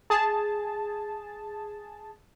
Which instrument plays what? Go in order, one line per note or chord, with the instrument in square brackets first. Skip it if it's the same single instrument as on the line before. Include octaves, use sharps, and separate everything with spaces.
[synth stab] G#4 A5